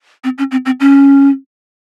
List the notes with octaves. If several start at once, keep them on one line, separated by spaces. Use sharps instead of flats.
C4
C#4
C4
C4
C#4